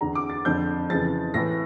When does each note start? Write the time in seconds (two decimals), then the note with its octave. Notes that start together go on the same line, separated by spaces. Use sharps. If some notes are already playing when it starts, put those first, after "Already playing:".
0.01 E2 D3 A#5
0.15 D6
0.30 A6
0.45 F2 D3 G6
0.90 F2 C#3 E3 A6
1.34 A2 E3 A#6